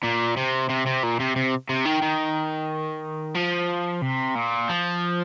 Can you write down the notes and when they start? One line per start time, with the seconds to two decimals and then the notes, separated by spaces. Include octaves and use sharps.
0.03 A#2
0.36 C3
0.69 C3
0.86 C3
1.03 A#2
1.20 C3
1.36 C3
1.70 C3
1.86 D#3
2.02 D#3
3.35 F3
4.02 C3
4.35 A#2
4.69 F3